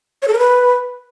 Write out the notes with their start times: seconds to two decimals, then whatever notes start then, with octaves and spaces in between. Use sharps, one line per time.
0.22 C#5
0.28 A4
0.33 A#4
0.39 B4